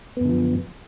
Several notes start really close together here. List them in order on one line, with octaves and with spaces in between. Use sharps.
B3 F#2 D3 F3